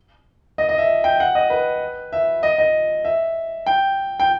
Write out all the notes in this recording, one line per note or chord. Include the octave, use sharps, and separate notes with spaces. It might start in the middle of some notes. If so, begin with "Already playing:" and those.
D#5
D#5
E5
G5
F#5
D#5
B4
E5
D#5
D#5
E5
G5
G5